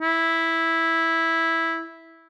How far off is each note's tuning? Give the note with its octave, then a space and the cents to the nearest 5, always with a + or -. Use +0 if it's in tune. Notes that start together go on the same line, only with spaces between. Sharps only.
E4 -5